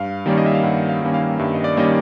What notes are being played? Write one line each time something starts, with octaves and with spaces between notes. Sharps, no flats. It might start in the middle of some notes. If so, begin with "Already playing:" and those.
Already playing: G2 F5
D#3 G3 A#3 C#4 D5
D#5
E5
F5
G2 F#5
F5
D#3 G3 A#3 C#4
F5
G2 E5
D#5
D5
D#3 G3 A#3 C#4 D#5